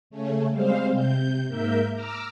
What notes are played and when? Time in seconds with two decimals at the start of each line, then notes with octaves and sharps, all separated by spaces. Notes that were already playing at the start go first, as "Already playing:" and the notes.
0.10 C#3 A3 C#4
0.50 G3 G#3 C4 C5 F5
0.92 C3 G6
1.47 G#2 A#3 A#4 E5 G6
1.93 A#5 D6 E6 F6